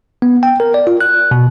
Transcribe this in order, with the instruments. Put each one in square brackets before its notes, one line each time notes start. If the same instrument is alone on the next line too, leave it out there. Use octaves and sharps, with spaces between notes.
[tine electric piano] B3
G5
A#4
D5
F4
F#6
B2